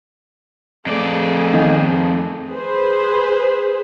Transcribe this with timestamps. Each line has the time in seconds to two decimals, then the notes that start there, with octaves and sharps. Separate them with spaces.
0.86 F2 A3 G#4 D5
1.54 D#3
2.49 G#4 B4 C5